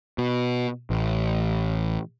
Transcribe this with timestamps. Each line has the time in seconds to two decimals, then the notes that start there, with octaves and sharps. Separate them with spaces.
0.18 B2
0.90 A1